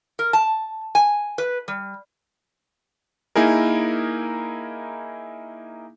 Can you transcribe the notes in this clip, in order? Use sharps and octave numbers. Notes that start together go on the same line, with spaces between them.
A#4
A5
G#5
B4
G3
A#3 D#4 E4 G#4 A#4